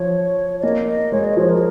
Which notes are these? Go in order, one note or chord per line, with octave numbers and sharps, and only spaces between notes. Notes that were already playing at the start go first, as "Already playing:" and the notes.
Already playing: F3 C#5
C#5
A#3 D#5
D#5
G#3 C#5
D#5
F3 C#5
A#4